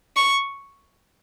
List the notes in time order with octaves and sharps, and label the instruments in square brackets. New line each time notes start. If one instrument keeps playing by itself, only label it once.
[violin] C#6